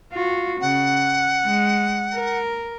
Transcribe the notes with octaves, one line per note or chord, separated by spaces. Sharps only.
F4 F#4
C#3 F#5
G#3
A#4